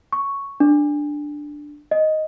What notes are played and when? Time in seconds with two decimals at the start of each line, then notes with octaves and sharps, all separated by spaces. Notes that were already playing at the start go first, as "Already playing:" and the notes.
0.12 C#6
0.60 D4
1.91 D#5